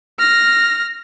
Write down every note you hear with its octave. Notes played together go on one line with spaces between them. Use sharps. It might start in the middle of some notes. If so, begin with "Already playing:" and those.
F6 A#6